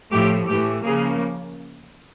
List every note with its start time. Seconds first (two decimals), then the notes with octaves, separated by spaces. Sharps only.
0.12 A2 F3 A3 G4
0.48 A2 E3 A3 G4
0.84 C#3 F3 A#3 G#4